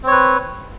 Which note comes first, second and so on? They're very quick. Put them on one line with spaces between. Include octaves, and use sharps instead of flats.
C4 C#5 B4